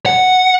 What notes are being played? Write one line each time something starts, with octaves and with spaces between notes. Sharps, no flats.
F#5